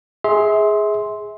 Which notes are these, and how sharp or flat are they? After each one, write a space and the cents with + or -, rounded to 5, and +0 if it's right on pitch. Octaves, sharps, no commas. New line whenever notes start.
G#4 +0 E5 -30 C6 +0